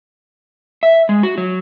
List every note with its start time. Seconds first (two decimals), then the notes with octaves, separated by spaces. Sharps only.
0.83 E5
1.09 G#3
1.23 F#4
1.38 F#3